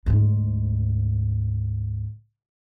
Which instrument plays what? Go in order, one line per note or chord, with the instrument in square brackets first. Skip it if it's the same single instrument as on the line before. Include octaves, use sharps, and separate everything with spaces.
[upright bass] D2 G#2